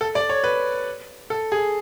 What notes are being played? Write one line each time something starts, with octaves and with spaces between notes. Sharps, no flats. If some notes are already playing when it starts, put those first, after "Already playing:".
A4
D5
C#5
B4
A4
G#4